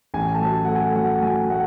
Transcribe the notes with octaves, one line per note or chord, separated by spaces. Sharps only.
A1 G#5
A5
F#3
A3 F#5
G#5
F#3 F#5
F#3 G#5
A3 F#5